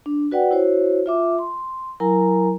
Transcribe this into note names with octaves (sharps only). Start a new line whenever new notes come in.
D4
F#4 B4 D5 F#5 G5
E4 F#4 C5 C#5
F4 E5 D6
C6
F#3 E4 A#4 G#5 A#5